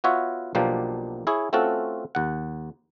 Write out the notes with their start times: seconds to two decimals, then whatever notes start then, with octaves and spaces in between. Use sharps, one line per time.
0.04 B3 F4 F#4 C#5 E5
0.55 B1 B2 F3 A#3 D4 G4
1.27 E4 G#4 C#5
1.53 A3 C4 C#4 F4 F#4 A4
2.15 D#2 F#5